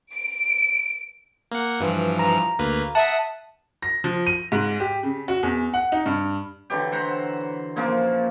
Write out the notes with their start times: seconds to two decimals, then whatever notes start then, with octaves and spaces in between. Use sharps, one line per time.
0.12 D7
1.51 A#3 F#5
1.80 G2 E3 F3
2.19 A#5
2.59 D2 A#3 B4
2.95 E5 F#5 A5 D#6 C7
3.82 A#6
4.04 F3
4.27 D#7
4.52 G#2
4.80 G4
5.03 C#3
5.28 F#4
5.43 E2
5.74 F#5
5.92 D#4
6.06 G2
6.70 D3 E3 F#3 G4
6.92 C5 F#5 A#5 B5
7.76 A#2 C#3 F3 A#3